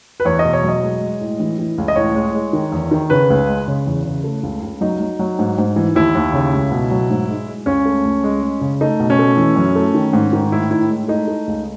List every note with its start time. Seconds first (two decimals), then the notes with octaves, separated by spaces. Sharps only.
0.20 B4
0.25 E2 C#5
0.39 D#5
0.45 B2
0.53 C#5
0.63 F#3
0.69 D#5
0.83 G#3
1.01 G#3
1.21 A2
1.40 E3
1.59 E3
1.78 C#2
1.88 D#5
1.96 A2 C#5
2.15 G#3
2.34 G#3
2.53 D#3
2.72 E2
2.91 D#3
3.10 C#3 B4
3.30 C#2
3.48 G#3
3.68 C#3
3.86 E2
4.06 C#3
4.24 A3
4.43 C#2
4.63 C#2
4.81 F#3 D#4
5.01 F#3
5.19 F#3
5.39 G#2
5.58 G#2
5.76 E3
5.95 D#2 E4
6.15 D#2
6.33 C#3
6.53 C#2
6.72 B2
6.91 F#3
7.10 G#2
7.29 G#3
7.48 G#3
7.66 C#2 C#4
7.85 A3
8.05 C#2
8.24 G#3
8.43 G#3
8.61 C#3
8.81 A3 D#4
9.00 B2
9.10 C#4
9.19 A3
9.37 E3
9.56 F#2
9.76 A3
9.94 D#3
10.13 G#2
10.33 D#3
10.52 A2 E4
10.71 A2 E4
10.89 G#3
11.08 A3 D#4
11.28 A3
11.47 C#2